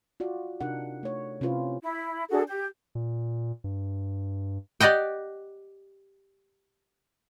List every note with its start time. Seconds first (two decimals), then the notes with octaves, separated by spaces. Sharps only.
0.20 F4 F#4 D5
0.61 C3 D4 D#4 G4 A#4 F#5
1.03 A3 C#5
1.41 C3 C#4 E4 F4 B4 C5
1.82 E4
2.30 D4 F#4 G#4 A4
2.48 G4 G6
2.95 A#2
3.64 G2
4.80 G4 D5 D#5 F#5 G5